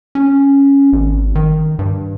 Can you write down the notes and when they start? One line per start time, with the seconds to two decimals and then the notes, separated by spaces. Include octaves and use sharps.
0.15 C#4
0.93 G#1
1.35 D#3
1.79 G2